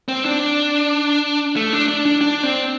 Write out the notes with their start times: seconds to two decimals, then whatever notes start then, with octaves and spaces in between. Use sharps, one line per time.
0.08 C4
0.25 D4
1.56 A3
1.73 D4
1.88 D4
2.06 D4
2.21 D4
2.43 C4